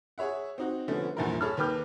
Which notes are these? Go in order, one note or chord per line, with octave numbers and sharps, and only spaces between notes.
G#4 C#5 E5 F#5
C4 D#4 F#4
D3 F3 A3 B3 C#4
E2 G2 A#2 F3 E4 A#4
G#4 A4 C#5 A5 B5 F6
D#2 B4 G5 D6 F6 G6